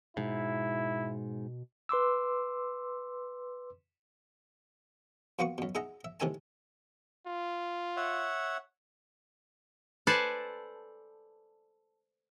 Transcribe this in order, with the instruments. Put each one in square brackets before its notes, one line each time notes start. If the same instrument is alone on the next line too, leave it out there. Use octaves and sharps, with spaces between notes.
[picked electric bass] G#2 [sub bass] B2 [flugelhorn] E4
[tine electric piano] B4 C6 D6 E6
[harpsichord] A#2 A#3 B3 F#4 F#5 C#6
F#2 B2
D#4 G#4 E5 F#5 A#5
E5
A2 C3 D#3 E5 G#5 A5
[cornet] F4
[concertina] C#5 E5 F#5
[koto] A4 B4 C5 D5 G#5 A5